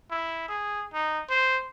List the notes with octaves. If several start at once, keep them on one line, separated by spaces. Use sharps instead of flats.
E4
G#4
D#4
C5